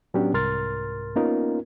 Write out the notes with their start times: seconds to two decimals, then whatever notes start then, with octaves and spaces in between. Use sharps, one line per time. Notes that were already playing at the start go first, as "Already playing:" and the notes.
0.14 A2 F#3 B3 C#4 D4 G4
0.34 C2 G#2 A#4 C6 F6 A6
1.16 A#3 B3 C#4 D#4 F4 A#4